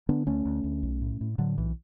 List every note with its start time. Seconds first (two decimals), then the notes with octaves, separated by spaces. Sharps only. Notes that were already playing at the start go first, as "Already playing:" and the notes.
0.09 D3 B3 D4
0.27 D2 A3 C#4
0.45 D2
0.64 D2
0.83 B1
1.01 A2
1.21 A2
1.38 A2 D3 F#3
1.58 B1 E3